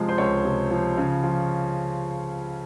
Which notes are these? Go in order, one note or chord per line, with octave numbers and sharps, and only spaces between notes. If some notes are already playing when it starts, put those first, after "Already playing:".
Already playing: C3 F3 G#3
C5
C#2 C#5
C3
F3
C#3
F3